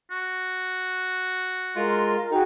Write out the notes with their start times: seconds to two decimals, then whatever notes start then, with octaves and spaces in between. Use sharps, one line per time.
0.11 F#4
1.76 G#3 F4 A#4
2.31 D#4 F#4 G#4 G5